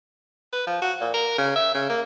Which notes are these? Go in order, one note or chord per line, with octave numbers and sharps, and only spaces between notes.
B4
F3
F#4
A#2
A#4
C#3
E5
C#3
A#3